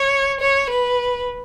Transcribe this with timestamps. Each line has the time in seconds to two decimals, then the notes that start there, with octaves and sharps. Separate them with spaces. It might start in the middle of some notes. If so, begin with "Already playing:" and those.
Already playing: C#5
0.40 C#5
0.70 B4